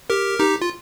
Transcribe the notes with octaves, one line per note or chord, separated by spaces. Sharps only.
G4 A#4
D#4 G4
F4